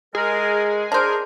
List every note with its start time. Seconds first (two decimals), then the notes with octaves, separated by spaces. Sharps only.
0.15 G#3 G#4 A#4
0.92 D4 A#4 C5